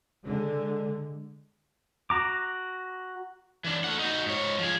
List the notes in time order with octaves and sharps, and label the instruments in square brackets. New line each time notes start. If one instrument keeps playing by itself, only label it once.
[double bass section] D3 G#3
[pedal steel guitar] F#4 A#5 D6
[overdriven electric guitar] E3 D4
A3 F#5
D#4 F#4
G#2 C#5
F3 G#4